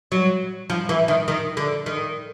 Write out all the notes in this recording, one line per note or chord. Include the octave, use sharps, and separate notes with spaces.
F#3
F3
E3
D#3
D#3
D3
D#3